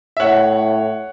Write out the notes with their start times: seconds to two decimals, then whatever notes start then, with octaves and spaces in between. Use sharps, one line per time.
0.17 E5
0.20 A2 C#5 F#5